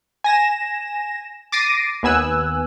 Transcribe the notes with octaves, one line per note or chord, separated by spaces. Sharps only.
G#5 A#6 E7
D6 A6 A#6 C7 D7 D#7
D#2 B3 G#5 E6 F#6